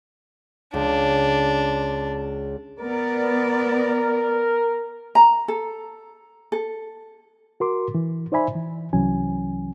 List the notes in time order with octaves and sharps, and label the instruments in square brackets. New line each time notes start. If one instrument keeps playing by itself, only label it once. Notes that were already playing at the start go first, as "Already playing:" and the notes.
[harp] C#2 [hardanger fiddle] D4
[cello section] B3 D5 [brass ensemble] A#4
[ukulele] A#5
A4
A4
[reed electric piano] F#4 A#4 C6 D6
E3
D#4 C5 D5 E5 G#5 B5
E3
C2 E3 F#3 C#4 G#5